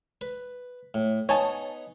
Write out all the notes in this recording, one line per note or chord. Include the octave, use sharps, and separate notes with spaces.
B4
A2
B3 D#4 C#5 D#5 G#5 A5